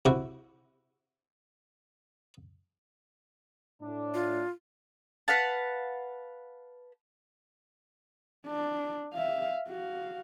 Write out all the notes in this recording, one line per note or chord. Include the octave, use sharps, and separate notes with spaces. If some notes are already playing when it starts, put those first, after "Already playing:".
C3 E4 F#4
A2 D4
F4
B4 F5 F#5 A5
D4
E5 F5
F#4 F5